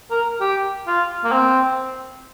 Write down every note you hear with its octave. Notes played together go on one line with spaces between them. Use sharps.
A#4
G4
F4
A#3
C4